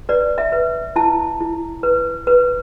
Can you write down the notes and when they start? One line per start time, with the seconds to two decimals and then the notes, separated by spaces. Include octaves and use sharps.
0.09 B4 D5
0.38 E5
0.52 B4
0.96 E4 A5
1.41 E4
1.83 B4
2.27 B4